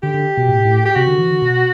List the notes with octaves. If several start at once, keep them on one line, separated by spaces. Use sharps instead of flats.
D3 G4
D3
B2
A2
A2
G4
C3 F#4
D3
E3
D3
B2